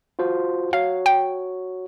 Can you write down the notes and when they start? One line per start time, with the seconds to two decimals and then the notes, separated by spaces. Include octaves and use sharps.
0.19 F4 F#4 C5
0.73 F#4 C#5 F5
1.06 G5